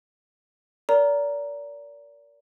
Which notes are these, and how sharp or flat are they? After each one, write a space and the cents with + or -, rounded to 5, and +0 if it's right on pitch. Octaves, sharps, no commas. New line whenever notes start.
A#4 +0 D5 -35 A#5 +0